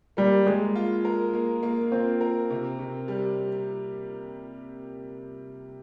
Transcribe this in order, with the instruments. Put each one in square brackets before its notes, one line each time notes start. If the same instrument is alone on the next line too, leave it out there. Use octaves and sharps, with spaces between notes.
[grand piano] G3 [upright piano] A#3
[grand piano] G#3 [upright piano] A#3
[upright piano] F4
A#4
A#3
A#3
[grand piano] C4 [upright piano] F4
[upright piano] A#4
C3
C3
G3